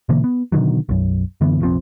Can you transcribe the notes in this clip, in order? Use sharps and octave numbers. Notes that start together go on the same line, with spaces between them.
B2 D3 E3 A#3
B3
B2 D3 D#3 F#3
B1 F#2
F#2 D3 E3 B3
F1 A#1 F3 C4